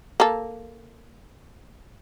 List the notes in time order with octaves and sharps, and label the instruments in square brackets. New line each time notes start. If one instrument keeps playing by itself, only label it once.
[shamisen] A#3 A4